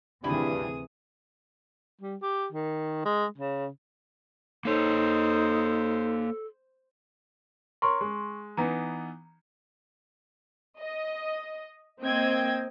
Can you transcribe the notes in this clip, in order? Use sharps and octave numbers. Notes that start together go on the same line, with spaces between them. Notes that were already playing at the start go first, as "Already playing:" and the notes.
D2 G2 C3 E3 E4 G#4 D#6
G3
G4
D#3
G#3
C#3
A#3 D#4 A4 C5 C#5
A#4 C#5 C6 C#6
G#3
E3 B3 D#4 A#5
D#5
A#3 C4 D#5 G5 G#6